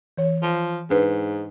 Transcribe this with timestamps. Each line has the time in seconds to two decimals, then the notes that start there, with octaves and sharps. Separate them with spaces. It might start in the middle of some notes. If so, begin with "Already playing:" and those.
0.17 E3 C#5
0.43 F3
0.90 G#2 D4 B4